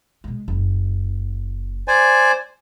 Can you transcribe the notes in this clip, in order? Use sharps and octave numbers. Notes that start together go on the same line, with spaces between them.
B2 G#3
F#1
C5 D5 G#5